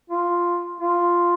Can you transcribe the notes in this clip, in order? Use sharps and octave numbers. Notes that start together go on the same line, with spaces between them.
F4
F4